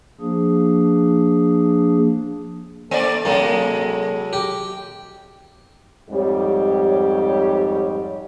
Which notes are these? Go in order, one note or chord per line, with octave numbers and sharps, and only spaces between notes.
F3 A#3 D4 G#4
A#3 A4 D5
C3 F#3 G#3 A#3
G4
F2 G#2 G3 G4 C#5